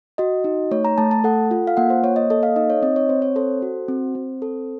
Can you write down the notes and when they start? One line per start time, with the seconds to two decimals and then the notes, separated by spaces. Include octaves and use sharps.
0.18 F#4 D#5
0.44 D#4
0.71 A3 C#5
0.85 A#5
0.98 A3 A5
1.11 A5
1.24 A4 F#5
1.51 F4
1.67 F5
1.77 A#3 F#5
1.90 C5
2.04 A#3 C#5
2.16 D#5
2.30 A4 D#5
2.43 F5
2.56 D#4 D#5
2.70 C#5
2.82 C4 D#5
2.96 C#5
3.09 C4 C5
3.22 C#5
3.36 A4 C5
3.62 F#4
3.88 C4
4.15 C4
4.42 A4